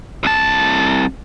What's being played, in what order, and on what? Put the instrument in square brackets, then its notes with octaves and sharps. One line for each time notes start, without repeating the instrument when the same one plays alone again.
[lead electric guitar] C2 A5